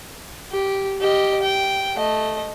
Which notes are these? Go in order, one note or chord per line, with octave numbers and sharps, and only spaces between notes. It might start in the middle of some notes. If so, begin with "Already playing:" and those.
G4
G4 D#5
G5
A3 D#5